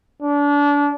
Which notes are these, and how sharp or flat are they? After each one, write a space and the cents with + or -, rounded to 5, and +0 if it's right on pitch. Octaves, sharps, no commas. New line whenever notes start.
D4 -30